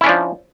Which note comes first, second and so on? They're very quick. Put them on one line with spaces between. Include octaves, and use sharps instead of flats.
E4 C#4 D4 F3